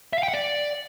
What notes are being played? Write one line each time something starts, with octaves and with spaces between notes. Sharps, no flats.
E5
F5
G5
F#5
D5